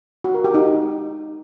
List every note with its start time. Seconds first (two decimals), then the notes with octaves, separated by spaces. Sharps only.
0.24 F#4
0.34 A#4
0.44 G4
0.54 D#4